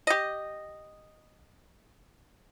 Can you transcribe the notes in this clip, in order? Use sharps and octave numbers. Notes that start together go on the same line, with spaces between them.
G4 D#5